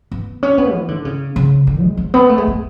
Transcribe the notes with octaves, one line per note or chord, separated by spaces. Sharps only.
B3
C#4
B3
E3
D3
C#3
C#3
D3
G#3
G#3
B3
A3
G#3
A3